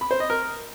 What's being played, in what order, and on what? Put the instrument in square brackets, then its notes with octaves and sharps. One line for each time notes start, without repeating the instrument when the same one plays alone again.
[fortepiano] B5
C5
D#5
A#4